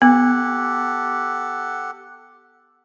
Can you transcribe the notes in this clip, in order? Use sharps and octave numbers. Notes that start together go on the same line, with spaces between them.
B3 G4 A4 F#5